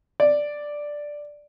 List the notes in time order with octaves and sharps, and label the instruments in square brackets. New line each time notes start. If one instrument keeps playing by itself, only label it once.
[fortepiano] D5